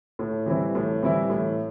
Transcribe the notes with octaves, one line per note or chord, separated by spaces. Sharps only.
A2
E3 G3 C4 E4
A2
E3 G3 C4 E4
A2